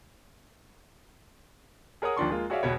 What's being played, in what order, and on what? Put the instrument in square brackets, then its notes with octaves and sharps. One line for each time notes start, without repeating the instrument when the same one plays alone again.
[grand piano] G#4 A#4 C#5 F#5 D#6
D#2 F3 D4 C6 C#6
G#3 A#3 F4
F#4 G#4 C#5 D5 E5 F5
E1 B2 B3 C#5